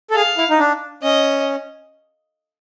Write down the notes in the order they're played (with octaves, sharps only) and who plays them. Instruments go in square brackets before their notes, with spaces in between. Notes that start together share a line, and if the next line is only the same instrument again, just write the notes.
[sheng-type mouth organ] A4
[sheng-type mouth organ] G#4 [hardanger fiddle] F5
[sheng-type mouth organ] E4
D#4
D4
[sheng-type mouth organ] C#4 [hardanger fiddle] D#5